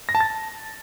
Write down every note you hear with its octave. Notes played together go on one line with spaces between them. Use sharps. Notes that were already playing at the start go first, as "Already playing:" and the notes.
A#6
A5
A6